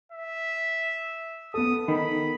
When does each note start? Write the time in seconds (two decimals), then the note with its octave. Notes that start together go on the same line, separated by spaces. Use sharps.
0.12 E5
1.54 B3 A4 D#6
1.88 D#3 B5